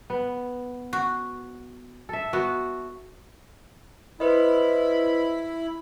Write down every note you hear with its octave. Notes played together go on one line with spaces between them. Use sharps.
B3
F#4
A4 E5
B3 F#4
E4 B4 C5 D#5 B5